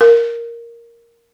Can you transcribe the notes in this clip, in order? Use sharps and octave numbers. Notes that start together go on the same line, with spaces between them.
A#4